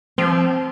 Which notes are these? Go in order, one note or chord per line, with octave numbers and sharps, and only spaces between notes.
F3 C4